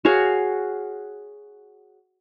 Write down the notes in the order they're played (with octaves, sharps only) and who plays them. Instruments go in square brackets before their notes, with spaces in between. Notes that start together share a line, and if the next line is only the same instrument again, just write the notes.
[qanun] F#4 G#4 C#5 F5